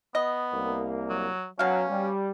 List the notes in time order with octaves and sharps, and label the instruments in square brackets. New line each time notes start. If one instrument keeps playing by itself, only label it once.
[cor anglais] B3 [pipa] D#5
[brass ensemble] C2 A#3
[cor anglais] F#3
[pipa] B2 F5 [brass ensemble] F#3 [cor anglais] C#4
[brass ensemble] G3